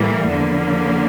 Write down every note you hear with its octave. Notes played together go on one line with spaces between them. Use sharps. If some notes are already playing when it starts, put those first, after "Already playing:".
Already playing: A2 E3 G3 A#3
E2 D3 F3 A#3